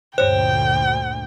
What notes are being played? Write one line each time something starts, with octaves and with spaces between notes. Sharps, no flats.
D2 G2 A#2 C5 C#5 G5 F#6